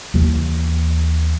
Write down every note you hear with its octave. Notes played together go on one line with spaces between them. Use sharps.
D#2 E3